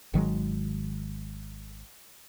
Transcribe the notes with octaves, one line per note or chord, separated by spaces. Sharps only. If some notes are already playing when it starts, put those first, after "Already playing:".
G#1 D#3 F#3 G#3